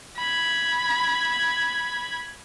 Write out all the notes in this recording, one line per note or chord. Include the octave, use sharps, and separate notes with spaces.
B5 G#6